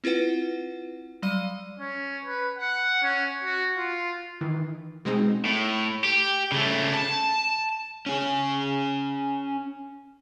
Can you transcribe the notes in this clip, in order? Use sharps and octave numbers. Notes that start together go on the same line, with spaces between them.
C4 E4 F4 B4 F#5
F#3 G3 D5 F5 D#7
C#4
B4
F#5
C#4
F#4
F4
D#3 E3
B2 G#3 C4 D#4
A2
G4
C#3 A3
A5
C#4 G#4